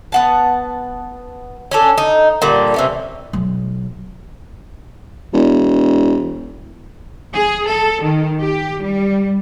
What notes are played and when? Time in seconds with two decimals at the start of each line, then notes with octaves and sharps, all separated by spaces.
0.12 B3 F#5 A5
1.71 C#4 D4 A4
1.98 D#4
2.42 A#2 D3 G3
2.74 C3 E3 C#4
3.33 B1
5.33 E1
7.33 G#4
7.67 A4
8.03 D#3
8.41 G4
8.82 G3